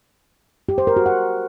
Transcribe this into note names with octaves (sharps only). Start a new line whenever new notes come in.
G4
C5
A#4
F#4
F#5